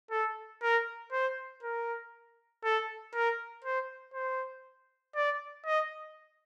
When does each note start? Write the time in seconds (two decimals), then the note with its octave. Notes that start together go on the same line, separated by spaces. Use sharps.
0.11 A4
0.62 A#4
1.12 C5
1.63 A#4
2.64 A4
3.14 A#4
3.64 C5
4.14 C5
5.15 D5
5.66 D#5